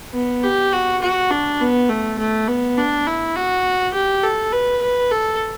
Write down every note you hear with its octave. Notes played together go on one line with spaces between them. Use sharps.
B3
G4
F#4
F#4
D4
B3
A3
A3
B3
D4
E4
F#4
G4
A4
B4
B4
A4